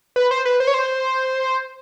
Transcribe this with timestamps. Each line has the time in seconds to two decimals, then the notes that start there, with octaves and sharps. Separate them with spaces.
0.16 B4
0.31 C5
0.45 B4
0.60 C5
0.67 C#5
0.74 C5